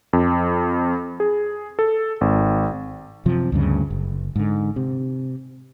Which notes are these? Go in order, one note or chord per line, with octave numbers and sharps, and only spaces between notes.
F2
G#4
A4
G#1
F#2 C3 F3
D2 G2 C#3
F#1
G#2 D3
C3